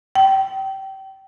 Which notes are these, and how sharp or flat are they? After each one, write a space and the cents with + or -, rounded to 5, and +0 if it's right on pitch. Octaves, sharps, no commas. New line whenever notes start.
G5 -25